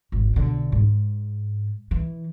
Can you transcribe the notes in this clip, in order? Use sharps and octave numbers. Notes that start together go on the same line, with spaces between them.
G#1
B1 D3
G#2
E3